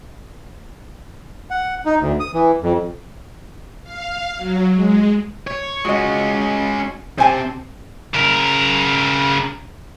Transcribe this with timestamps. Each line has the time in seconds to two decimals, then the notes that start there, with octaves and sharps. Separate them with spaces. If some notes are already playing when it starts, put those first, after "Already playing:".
1.50 F#5
1.85 D#4
2.00 D2
2.20 D#6
2.34 E3
2.62 F2
3.84 F5
4.37 F#3
4.73 G#3
5.47 C#5
5.85 G#3 C#4 F#4 D#5
7.18 C3 C4 C5 G#5 A5
8.15 C#3 A#4